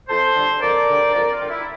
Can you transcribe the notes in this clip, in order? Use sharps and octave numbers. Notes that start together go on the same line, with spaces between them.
F2 A4 C5
D3 G3
F2 A#4 D5
D3 G3
F2 A#4 D5
F4
D3 G3
E4